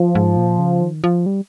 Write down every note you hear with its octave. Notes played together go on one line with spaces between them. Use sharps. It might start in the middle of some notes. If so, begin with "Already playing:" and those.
Already playing: F3
G#2
A#2
C#3
D#3
F3
G3